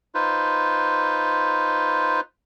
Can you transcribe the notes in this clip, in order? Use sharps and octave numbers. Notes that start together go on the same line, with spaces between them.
D#4 F4 B4 C5